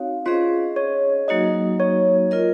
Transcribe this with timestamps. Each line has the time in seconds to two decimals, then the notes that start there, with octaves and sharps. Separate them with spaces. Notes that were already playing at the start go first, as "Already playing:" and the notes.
Already playing: C4 D#4 F#4 C#5 F5
0.26 C#4 F4 G#4 C5 D#5
0.76 C#5
1.28 F#3 A#3 D#4 F#4 D#5
1.80 C#5
2.31 F4 A#4 D#5